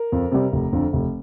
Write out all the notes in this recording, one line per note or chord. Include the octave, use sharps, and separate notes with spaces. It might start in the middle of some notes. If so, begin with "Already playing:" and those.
Already playing: A#4
F2
C3 G3
F1
F2 D3
F1